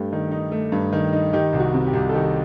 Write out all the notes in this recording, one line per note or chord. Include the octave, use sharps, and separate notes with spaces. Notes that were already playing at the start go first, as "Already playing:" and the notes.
Already playing: G2 A3 G4
D#3
D#4
A3
G2
D#3
D#4
D#3 G4
C2
F#4
C3
G4
C2
A4
D#3 G4